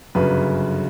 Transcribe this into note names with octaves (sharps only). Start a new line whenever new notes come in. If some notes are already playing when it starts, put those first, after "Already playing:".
G1 F#2 C#3 B4